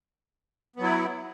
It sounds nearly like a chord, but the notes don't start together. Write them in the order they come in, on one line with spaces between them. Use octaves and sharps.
B3 F#3 E4